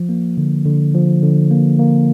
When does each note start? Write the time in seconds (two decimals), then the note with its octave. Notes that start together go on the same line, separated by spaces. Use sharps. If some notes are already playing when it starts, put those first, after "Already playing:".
Already playing: F3
0.09 A#3
0.38 D3
0.66 D3
0.94 F3
1.22 D3
1.51 A#3
1.79 A#3